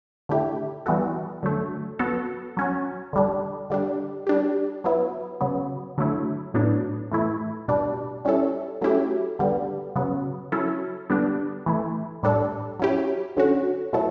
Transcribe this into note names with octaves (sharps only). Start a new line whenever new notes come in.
D3 A3 E4 G4
E3 G3 B3 F#4 A4
D3 F#3 A3
F#3 B3 F#4 A4
F#3 C#4 F#4
D3 G3 D4
D3 G3 D4
G3 D4 G4
F#3 B3 E4
C#3 F#3 B3
D3 F#3 A3 E4
A2 F#3 B3 D4
A2 E3 A3 E4
B2 G3 D4
G3 C#4 E4 A4
F#3 A3 C#4 E4 G4
D3 G3 B3
C#3 F#3 B3
F#3 C#4 E4 A4
D3 G3 B3 D4
E3 A3 E4
A2 G3 D4 A4
F#3 C#4 E4 G4
D3 F#3 C#4 F#4
B2 F#3 A3 E4 A4